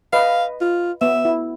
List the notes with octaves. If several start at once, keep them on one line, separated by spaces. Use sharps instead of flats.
B4 D#5 F5
F4
B3 E5
E4